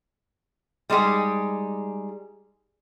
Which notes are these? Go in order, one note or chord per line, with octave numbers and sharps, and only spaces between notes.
G3 G#3 D#4 G4 G#4